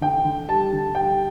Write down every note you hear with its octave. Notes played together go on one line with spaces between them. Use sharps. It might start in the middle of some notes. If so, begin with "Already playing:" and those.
D3 G5
D3
G3 A5
D3
G3 G5